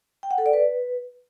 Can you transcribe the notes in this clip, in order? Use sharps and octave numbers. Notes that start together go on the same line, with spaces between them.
G5
F#5
A4
D5
B4